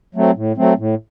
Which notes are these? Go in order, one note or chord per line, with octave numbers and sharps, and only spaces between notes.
F#3 A3 C4
A2
F#3 A3 C4
A2